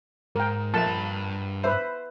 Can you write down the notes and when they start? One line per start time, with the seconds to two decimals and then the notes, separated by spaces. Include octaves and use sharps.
0.36 G#2 A#4 G5
0.74 A#1 A4 E5 A5
0.86 G2 B5
1.64 B4 C5 E5